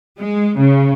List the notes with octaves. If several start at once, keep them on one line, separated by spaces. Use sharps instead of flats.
G#3
C#3